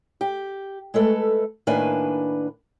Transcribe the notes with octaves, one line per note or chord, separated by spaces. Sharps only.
G4
G#3 A3 A4 B4
A2 D#3 A#3 D4 B4 G#5